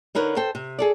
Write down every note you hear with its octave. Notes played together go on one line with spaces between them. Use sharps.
D3 D#4 A#4 B4 C#5
A4 C5 G5
C3
G#4 A4 D5